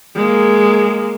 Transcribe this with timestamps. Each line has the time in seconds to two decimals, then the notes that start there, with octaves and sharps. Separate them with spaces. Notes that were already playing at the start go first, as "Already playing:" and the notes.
0.15 G#3 A#3